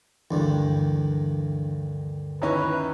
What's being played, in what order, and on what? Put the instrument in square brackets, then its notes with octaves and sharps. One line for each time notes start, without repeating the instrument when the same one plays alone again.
[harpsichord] D2 G2 D#3 [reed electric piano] E3 D4
[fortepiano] D#2 E3 C#4 [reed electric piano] D#4 E5 A#5 [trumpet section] B4